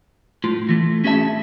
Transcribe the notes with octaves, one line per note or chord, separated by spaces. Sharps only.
A2 F4
E3 A3
C#4 F#4 G#4 E5 A5